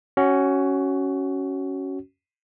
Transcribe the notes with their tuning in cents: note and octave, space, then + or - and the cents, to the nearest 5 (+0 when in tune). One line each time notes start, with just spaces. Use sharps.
C#4 +0 F#4 +20